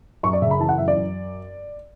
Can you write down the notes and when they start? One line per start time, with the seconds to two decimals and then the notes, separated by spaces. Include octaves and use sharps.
0.23 F#2 C#6
0.33 D5
0.42 C#3 E5
0.51 B5
0.59 E3 A5
0.69 F#5
0.78 F#2 E5
0.88 D5
0.96 F#2